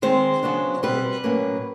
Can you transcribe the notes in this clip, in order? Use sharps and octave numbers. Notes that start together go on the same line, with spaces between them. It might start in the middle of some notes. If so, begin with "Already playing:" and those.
D#3 G#3 C4 C5
C#3 F#3 B3 D4
B2 G3 C4 B4
A2 F#3 A#3 C#4